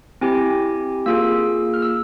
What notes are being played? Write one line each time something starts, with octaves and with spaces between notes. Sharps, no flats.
C4 E4 G4 G#5
A#3 F4 G#4 E6
F6
E6